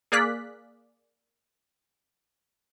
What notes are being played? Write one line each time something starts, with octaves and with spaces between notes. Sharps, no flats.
A#3 G#4 D5 F5 F#6 B6